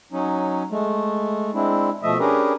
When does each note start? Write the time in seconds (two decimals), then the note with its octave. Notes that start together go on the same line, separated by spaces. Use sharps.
0.12 F#3 C#4 D#4
0.70 G#3 A3
1.54 G#3 C4 D4 E4
2.03 B2 F3 A3 D#5 E5
2.20 C#4 D4 G4 G#4 A#4 B4